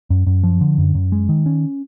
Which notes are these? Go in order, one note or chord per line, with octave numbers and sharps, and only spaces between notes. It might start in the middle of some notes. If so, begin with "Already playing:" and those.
F#2
F#2
F3
D3
F#2
F#2
G#3
D#3
C#4